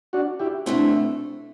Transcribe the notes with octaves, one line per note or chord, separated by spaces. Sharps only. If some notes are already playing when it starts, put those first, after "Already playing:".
D4 F#4
E4 G4
B2 A3 C4 D4 E4